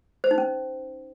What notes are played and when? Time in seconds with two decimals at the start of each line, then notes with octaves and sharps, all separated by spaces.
0.24 C5
0.31 D#4
0.38 C#4